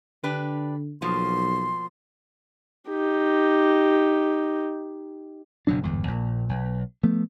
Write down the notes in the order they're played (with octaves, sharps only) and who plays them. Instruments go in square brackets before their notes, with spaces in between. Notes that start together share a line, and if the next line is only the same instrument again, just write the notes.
[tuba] D3 [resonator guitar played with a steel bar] D4 G4 B4
[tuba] B1 [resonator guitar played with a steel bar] B2 F3 A#3 [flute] C6
[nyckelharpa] D#4 G4
[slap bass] F#1 B2 F#3 D4
G1 E2 G#2
A#1 A#2
B1
F3 A3 B3